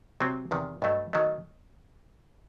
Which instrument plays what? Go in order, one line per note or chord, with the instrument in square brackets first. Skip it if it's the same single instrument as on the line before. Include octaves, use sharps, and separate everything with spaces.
[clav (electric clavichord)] C3 F#3 C4
E2 C3 D#3
[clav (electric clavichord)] G2 F#3 A3 [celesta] D#5
[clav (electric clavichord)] D#3 F#3 A3 [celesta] D#5